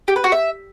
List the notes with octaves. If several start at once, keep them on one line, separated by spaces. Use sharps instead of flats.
G4
B4
F#4
E5